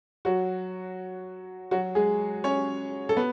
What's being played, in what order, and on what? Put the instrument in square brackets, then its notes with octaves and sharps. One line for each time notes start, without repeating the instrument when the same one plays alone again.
[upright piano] F#3 F#4
F#3 F#4
G#3 G#4
C#4 C#5
A4
B3